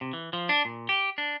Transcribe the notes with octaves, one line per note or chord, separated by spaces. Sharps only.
C3
E3
F3
D4
A#2
G4
D4